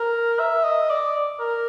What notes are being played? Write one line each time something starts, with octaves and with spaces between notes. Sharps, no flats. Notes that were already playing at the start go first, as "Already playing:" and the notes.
Already playing: A#4
E5
D#5
D5
A#4